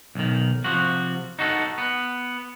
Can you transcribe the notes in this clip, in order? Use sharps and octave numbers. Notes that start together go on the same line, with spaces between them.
B1 D#3
C3 F3 F#4
D#4 F#4 A4
B3